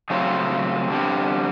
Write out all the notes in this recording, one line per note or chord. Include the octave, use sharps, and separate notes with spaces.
C#3 F#3 A3 C4 F4
D3 G3 C4